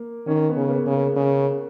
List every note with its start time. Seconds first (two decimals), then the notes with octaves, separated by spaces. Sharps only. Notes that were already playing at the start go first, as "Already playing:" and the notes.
Already playing: A#3
0.27 D#3 C#4
0.49 B3
0.57 C#3
0.68 A#3
0.71 B3
0.87 C#3
0.94 A#3
1.16 C#3